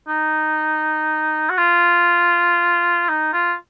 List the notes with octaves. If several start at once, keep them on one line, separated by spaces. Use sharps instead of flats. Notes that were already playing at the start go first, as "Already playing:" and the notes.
D#4
F#4
F4
D#4
F4